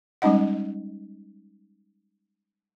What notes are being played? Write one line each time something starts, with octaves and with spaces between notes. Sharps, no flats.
G3 G#3 C#4 D#4 D#5 F#5